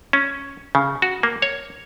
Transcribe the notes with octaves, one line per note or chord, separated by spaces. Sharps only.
C#4
C#3
F#4
A#3
C#5